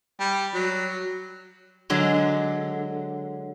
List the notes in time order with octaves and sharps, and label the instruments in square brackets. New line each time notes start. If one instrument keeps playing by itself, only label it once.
[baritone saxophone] G3
F#3
[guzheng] D3 F#3 G#3